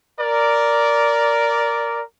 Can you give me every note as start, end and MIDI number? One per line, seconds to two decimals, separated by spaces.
0.21 2.03 70
0.21 2.03 74